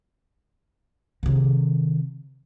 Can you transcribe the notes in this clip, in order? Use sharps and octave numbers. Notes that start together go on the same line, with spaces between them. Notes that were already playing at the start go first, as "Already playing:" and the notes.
C3 D#3